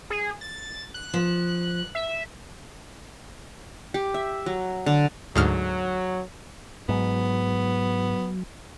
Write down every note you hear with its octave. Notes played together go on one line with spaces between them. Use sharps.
G#4
A6
F#6
F3
E5
G4
E5
F#3
D3
D2 G#2 F#3 F6
G#2 F#3 B3